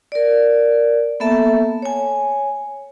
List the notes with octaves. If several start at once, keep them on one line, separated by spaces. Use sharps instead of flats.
A#4 D5
A#3 B3 A4 E5 A5
C#5 G#5